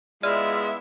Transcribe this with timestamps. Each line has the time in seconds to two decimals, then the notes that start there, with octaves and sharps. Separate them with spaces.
0.23 G#3 B3 E4 F4 D5 E5 F6 D#7